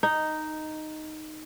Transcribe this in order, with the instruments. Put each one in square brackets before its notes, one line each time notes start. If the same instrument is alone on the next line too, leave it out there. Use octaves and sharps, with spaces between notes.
[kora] D#4